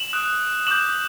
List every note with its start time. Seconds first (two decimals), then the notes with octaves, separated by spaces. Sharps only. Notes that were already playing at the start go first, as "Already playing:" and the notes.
Already playing: E7 F#7
0.13 D#6 F#6
0.67 D6 G6 E7 F#7